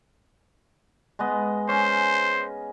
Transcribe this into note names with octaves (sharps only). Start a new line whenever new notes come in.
G#3 B3 D#5
C#4 C5